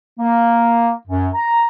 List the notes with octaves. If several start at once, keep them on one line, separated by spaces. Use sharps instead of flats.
A#3
F#2
A#5